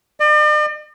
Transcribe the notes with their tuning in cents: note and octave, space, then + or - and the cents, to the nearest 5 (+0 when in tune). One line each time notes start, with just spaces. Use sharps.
D5 +45